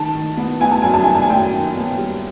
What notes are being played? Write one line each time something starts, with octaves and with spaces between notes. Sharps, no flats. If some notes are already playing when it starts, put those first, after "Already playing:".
Already playing: D#3 A5
D#3
B3
B3 G#5
A5
F#2 G#5
A5
B3 G#5
A5
G#5
F#2 G5
D#3
B3
G3